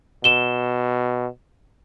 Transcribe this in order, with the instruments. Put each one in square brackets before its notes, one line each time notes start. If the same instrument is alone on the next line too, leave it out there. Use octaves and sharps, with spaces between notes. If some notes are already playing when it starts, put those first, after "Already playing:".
[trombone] B2 [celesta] E7 G7